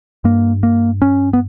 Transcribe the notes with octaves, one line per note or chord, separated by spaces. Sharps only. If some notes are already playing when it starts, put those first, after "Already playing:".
G2 A#3
A#3
C#4
B3